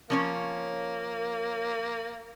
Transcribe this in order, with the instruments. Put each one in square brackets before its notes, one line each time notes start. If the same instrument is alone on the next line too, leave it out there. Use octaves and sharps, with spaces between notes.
[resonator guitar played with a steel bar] F3 C#4 C#5 [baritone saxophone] A#3